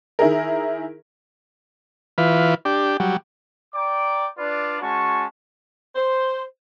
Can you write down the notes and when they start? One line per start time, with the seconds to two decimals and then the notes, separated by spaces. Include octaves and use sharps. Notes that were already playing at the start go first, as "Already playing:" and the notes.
0.19 D#3 E4 G#4 A#4
2.18 E3 F4 B4
2.65 D4 G4
3.00 F#3 G3
3.75 D5 G5 A#5 D6
4.38 D4 F4 B4 D5
4.82 G#3 C#4 F#4 A5 C#6
5.96 C5